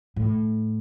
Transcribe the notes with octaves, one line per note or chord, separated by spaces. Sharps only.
A2